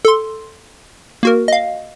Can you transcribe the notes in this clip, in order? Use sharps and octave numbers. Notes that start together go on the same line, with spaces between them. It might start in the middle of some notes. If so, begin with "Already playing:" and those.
A4 C6
A#3 F#4 A#4
D#5 F5